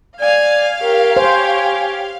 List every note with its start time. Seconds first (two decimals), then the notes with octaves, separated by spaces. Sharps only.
0.19 D5 F5 G#5
0.81 G4 A#4 C#5
1.17 C5 G#5